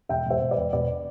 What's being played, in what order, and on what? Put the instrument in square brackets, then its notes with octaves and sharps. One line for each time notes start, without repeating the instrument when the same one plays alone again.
[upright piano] E1 E5 G5
E1
C5 E5
E1
B4 D5
E1
E1 B4 D5